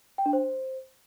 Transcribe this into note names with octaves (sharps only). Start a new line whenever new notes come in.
G5
D4
C5